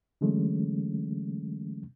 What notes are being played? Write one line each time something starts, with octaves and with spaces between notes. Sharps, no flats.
D3 E3 F#3 G#3 A3 C#4